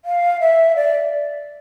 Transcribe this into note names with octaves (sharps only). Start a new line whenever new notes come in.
F5
E5
D5